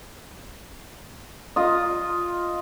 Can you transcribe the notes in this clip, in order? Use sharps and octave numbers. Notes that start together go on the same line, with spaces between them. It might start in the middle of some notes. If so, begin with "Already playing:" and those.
F4 D#5